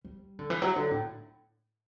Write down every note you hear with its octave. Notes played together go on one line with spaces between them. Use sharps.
G3
D3
E3
F#3
D3
A2